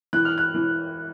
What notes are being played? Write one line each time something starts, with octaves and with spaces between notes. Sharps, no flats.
E3 F#6
F6
F#6
E3